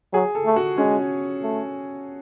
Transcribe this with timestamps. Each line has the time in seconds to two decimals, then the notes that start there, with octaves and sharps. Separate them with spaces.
0.13 F#3 G#4
0.35 A4
0.45 A3
0.56 F#4
0.77 G#3 C#4
1.43 A3